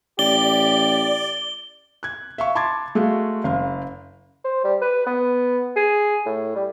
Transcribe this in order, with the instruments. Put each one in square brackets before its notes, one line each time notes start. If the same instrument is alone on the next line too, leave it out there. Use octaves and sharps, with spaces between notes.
[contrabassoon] A1 [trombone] G4 [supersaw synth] D5 [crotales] G7
[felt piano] F#6 G#6
E5 F5 C#6
A5 B5 C6 D6 G#6 A6
G#3 A3 F#4 F5
F#1 F5
[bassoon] C5
G3
B4
B3
G#4
A2
G3